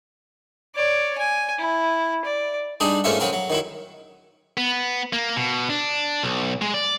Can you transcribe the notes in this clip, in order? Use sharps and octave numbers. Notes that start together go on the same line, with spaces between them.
C#5 D5
G#5
E4
D5
G3 D4 D#4 G#4
G#2 A3 A#3 C#4 F4 E5
C#3 F#3 C4 A#4
F#3
D#3 F#3 E4
B3
A#3
B2
D4
B1
G#3
D5